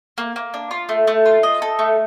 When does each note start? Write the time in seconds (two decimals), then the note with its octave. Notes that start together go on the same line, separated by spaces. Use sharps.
0.18 A#3
0.36 A#3
0.54 D4
0.71 F4
0.89 A3
1.07 A3
1.26 F4
1.43 D#5
1.62 A4
1.79 A3